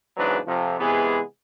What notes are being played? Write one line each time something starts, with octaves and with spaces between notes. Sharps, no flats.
E2 G#2 C#3 F#3 D4 B4
F2 C3 F3
C3 E3 G#3 B3 G#4